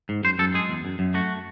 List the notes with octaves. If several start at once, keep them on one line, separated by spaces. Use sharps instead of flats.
G#2
F#2 C5
F#2 A4
G#3 G#4
E2
F#2
F#2
A3 F#4